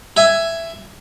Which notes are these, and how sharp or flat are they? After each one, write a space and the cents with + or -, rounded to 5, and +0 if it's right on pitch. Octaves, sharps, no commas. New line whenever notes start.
E5 +10 G#5 +0